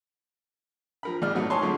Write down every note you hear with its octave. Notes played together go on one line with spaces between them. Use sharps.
F3 A#4 B5
A#1 G#2 D5 F6
E3 F#3 A3 D#4 F#4 A4
C#5 G#5 A5 C6 C#6
A#2 D3 F#3 G#3 A3